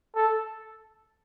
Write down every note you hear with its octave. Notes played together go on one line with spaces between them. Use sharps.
A4